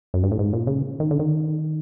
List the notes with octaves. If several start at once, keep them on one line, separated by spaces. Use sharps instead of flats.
F#2
G2
A2
G#2
A#2
C#3
D#3
D3
D#3